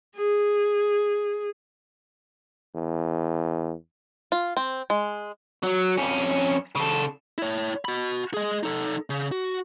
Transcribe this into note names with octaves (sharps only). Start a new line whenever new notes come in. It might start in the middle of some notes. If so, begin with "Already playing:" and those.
G#4
E2
F4
C4
G#3
F#3
F2 C#4
C#3 A4
E4 C#5
F#4 B5
G#4 D#5
D#4 A4
C#3
F#4